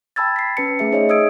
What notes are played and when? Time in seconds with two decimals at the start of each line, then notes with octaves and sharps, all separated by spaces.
0.16 G5 A5 B5 E6 G#6 A6
0.36 B6 C7
0.57 C#4 B4 A5 C#7
0.79 A3 G#4 E5 C#7
0.92 D#4 G#4 C5 C#5 D#5 E5
1.09 D#5 D#6 E6 G#6 D7